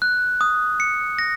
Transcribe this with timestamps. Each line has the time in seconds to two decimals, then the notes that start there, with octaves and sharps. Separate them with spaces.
0.02 F#6
0.41 D#6
0.80 C#7
1.19 A#6